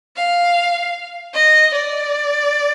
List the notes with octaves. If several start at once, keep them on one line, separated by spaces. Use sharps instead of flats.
F5
D#5
D5